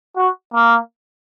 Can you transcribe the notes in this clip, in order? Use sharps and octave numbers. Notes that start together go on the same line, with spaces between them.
F#4
A#3